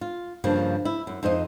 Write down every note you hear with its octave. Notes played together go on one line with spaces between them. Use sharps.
F4
G2 C#3 F3 A#3
E4
F#2
F2 D#4 C5 D#5